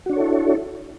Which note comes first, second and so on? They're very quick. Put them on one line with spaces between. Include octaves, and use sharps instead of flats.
F#4 D4 C#5 A4 E4